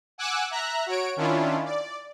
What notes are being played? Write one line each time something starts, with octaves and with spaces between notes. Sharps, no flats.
F#5 G#5 D6 E6 F#6
E5 A#5 F#6
F#4 C#5 D7
D#3 C#4 D4 E4 F4
D5